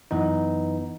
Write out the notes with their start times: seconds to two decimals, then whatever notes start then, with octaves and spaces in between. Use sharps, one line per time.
0.11 F#2 E3 B3 D#4